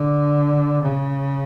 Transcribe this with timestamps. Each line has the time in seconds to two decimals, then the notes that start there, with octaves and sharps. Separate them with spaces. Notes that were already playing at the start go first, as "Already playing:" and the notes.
Already playing: D3
0.83 C#3